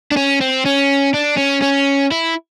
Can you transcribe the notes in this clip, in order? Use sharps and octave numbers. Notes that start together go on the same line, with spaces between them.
D4
C#4
C4
C#4
D4
C#4
C#4
E4